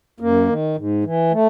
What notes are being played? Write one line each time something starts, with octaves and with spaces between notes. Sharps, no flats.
F#2 A#3
D#3
G#2
E3
A3